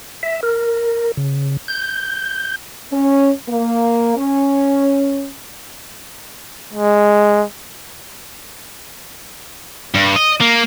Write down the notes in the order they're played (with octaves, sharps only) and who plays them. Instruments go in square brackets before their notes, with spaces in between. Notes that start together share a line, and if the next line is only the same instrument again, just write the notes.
[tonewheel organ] E5
A#4
C#3
G6
[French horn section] C#4
A#3
C#4
[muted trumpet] G#3
[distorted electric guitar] G2
D#5
A#3